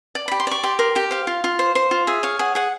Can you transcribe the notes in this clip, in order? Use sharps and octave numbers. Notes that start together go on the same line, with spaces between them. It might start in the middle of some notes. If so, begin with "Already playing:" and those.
D5
G4 B5
C6
D5 C#6
G4 C6
A#4 C6
G4 G5
C5 F5
F4
F4
C5
C5
F4
G#4 E5
C#5 F5
G#4 F#5
G#4 F#5